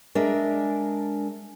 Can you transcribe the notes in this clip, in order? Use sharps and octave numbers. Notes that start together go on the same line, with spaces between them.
G#3 D4 A#4 E5